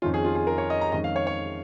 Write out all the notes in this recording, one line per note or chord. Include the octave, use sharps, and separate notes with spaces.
F2 D#3 C#4 F4
G#4
F4
G#4
A#4
C#5
D#5
A#5
F2 D#3 G#3 C#4 D#5
F5
C#5
C#5